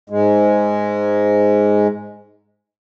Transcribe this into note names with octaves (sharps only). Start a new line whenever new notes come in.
G#2 G#3